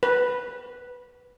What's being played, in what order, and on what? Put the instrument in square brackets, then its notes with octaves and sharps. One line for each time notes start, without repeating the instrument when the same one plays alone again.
[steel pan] B4